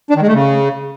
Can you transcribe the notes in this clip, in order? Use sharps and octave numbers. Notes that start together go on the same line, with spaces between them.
D4
D#3
G#3
A3
C#3